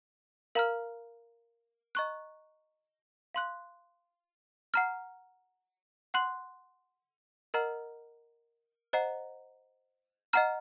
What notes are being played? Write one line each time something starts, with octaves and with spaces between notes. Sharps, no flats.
A#4 F5 A#5 F6
D#5 A#5 C#6 F#6
F5 C6 F#6
F#5 A#5 F6
F#5 C6 F#6
A#4 D#5 F#5 A#5 F6
C5 D#5 F#5 A#5
D#5 F#5 A#5 F6